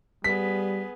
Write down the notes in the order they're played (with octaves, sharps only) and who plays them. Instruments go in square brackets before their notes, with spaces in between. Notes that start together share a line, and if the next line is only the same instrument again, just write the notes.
[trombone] G3 [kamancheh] B3 G#4 [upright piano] B6